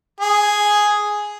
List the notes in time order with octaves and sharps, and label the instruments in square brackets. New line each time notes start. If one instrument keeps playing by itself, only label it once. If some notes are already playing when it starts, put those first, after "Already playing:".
[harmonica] G#4